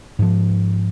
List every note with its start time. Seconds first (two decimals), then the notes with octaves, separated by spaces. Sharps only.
0.19 G#2 F3